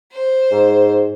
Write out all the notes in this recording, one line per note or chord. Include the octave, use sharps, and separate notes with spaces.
C5
G#2